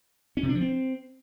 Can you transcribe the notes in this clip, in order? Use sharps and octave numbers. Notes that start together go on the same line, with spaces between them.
C#4
C3
D4
F3
C4